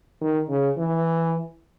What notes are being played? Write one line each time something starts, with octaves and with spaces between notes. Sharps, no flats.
D#3
C#3
E3